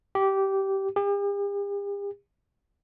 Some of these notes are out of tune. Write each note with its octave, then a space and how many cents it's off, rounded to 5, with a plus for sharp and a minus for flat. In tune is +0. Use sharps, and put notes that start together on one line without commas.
G4 -15
G4 +45